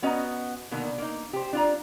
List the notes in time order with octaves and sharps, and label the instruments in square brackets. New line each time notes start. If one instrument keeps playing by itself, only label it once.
[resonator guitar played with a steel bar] B3 C#4 F#4 D#5 F#5 A#5
B2 D3 D#3 A#3
A#3 D#4
G4 C5
D4 F4 A#5